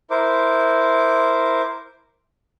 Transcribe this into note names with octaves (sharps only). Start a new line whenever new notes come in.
E4 A#4 C5 D6